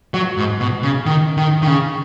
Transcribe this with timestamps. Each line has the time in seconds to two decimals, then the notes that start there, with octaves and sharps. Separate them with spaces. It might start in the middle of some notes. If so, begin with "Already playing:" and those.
0.14 F#3
0.37 G#2
0.60 B2
0.83 C#3
1.06 D#3
1.37 D#3
1.62 D#3
1.67 C#3